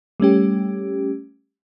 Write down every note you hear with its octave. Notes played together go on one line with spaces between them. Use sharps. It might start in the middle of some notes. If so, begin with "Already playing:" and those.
G3 A3 C#4 G4